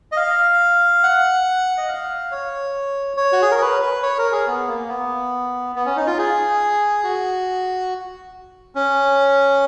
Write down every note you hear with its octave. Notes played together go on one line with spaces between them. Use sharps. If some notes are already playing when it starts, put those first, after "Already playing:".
D#5
F5
F#5
D#5
F5
C#5
C#5
F#4
G#4
A#4
B4
B4
C#5
A#4
G#4
B3
A#3
B3
B3
C#4
D#4
F4
G#4
F#4
C#4